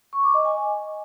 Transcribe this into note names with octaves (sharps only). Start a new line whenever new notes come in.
C#6
D6
D#5
G#5